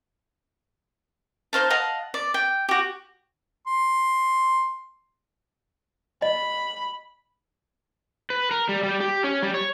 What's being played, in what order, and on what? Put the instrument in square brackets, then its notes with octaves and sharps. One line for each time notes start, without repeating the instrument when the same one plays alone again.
[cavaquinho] D#4 C5 F5 A5
D#5 F5 F#5 A5
D5
G5
F#4 G4
[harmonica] C6
[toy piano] D#5 [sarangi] B5
[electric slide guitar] B4
A#4
G3
G3
G4
C#4
G3
C#5